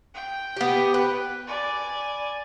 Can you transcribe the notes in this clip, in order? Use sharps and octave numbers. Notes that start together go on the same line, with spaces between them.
G5
B3 G4
B4
D5 G#5